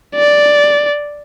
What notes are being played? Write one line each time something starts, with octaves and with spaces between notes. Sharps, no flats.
D5